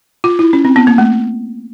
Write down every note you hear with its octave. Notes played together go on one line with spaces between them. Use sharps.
F4
E4
C#4
C4
B3
A#3
A3